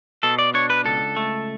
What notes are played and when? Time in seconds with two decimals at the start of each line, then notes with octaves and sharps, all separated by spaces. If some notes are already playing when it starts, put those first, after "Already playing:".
0.23 B2 A4
0.39 D5
0.54 D4 C#5
0.70 B4
0.85 C#2 A4
1.16 A3